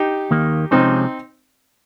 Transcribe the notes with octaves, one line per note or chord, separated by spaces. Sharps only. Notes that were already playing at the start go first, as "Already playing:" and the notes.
Already playing: D#4 G4
D#2 D#3 A#3
C3 F3 G#3 C4 C#4 D#4